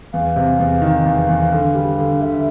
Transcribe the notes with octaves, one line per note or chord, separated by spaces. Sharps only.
E2 F5
C3
E2
D#3
E2
E2
D3
G3
D3
D3 E5